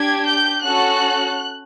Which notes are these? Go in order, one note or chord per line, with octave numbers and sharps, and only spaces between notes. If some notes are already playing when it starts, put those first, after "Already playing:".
Already playing: D4 G4 G#6
G6
C#4 F#4 A4 F#6